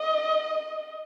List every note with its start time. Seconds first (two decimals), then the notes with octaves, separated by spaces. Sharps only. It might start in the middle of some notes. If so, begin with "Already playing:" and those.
Already playing: D#5